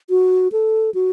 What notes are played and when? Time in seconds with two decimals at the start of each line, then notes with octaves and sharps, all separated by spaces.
0.10 F#4
0.52 A4
0.94 F#4